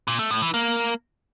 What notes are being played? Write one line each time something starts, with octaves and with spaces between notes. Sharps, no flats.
A#2
A3
A2
E3
A#3